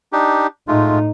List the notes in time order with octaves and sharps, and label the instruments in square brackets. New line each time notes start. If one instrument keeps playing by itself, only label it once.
[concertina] D4 D#4 G4
[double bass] A2 D#4 [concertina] G#3 A3 F4